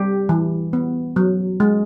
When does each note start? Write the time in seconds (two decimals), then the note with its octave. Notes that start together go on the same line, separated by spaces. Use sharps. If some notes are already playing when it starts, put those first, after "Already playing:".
Already playing: G3 G4
0.29 E3
0.73 B3
1.16 F#3
1.60 G#3